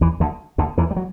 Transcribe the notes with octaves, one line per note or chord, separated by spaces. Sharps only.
E2 E3
D2 D3
D2 D3
E2 E3
G3
F#3